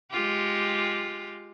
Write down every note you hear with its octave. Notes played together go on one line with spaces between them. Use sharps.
G#3 F4 G4